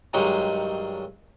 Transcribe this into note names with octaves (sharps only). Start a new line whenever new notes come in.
G2 D#3 F#3 G#3 C#4 D#4